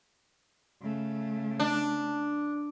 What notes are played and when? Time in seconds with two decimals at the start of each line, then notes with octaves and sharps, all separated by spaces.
0.83 C#3 A3
1.60 D4